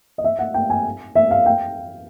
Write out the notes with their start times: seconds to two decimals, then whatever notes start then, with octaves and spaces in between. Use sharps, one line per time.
0.18 D#5
0.24 E5
0.39 F#5
0.54 G5
0.70 G#5
1.15 E5
1.31 F5
1.46 G5